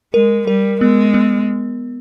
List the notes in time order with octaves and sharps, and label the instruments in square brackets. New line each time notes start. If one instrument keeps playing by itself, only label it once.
[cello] G#3 [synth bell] A#4
[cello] G3 [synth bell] A#4
[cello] G#3 [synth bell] B3
[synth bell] B3